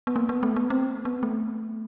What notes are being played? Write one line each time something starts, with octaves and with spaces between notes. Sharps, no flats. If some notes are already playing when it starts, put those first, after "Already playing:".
B3
A#3
B3
A3
B3
C4
B3
A3